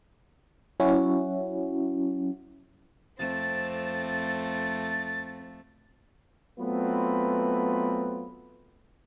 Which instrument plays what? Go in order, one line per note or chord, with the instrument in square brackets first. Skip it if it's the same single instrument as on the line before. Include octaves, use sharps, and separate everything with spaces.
[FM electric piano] F#3 C#4 E4 F#4
[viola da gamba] F2 A3 [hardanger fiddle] C4 [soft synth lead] A6
[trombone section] F#3 A3 B3 C4 F4 B4